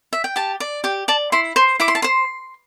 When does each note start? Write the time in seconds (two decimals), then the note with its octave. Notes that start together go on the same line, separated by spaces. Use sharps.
0.13 E5
0.24 G5
0.36 G4 A5
0.60 D5
0.84 G4 G5
1.08 D5 A5
1.32 E4 C6
1.56 C5 C6
1.80 E4 D6
1.88 C6
1.95 A5
2.02 C5 C6